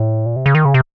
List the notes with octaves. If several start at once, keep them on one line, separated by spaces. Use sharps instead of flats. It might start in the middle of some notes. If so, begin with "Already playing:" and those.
Already playing: A2
A#2
C3
C#3
D#3
C#3
C3